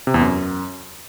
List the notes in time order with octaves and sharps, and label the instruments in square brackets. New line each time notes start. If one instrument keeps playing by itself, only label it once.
[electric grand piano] C3
E2
F#2